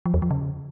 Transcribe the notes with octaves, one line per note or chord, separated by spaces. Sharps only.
F3
E2
F3
C#3